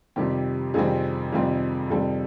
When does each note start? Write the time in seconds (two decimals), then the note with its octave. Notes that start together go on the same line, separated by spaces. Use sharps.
0.16 F2 C3 D#3 G3 C4 G4
0.74 F2 C3 D#3 G3 C4 G#4
1.32 F2 C3 D#3 G3 C4
1.90 F2 C3 D#3 G3 C4 A4